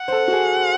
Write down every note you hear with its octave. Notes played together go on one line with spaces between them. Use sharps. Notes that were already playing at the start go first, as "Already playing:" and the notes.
Already playing: F#5
C5
A4
F#4
G#4